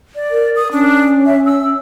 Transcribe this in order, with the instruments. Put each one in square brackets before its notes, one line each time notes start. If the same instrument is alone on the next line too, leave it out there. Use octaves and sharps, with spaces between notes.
[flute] D5
[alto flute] A#4
[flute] D#6
[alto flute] C#4 [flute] D4
[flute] E5
E6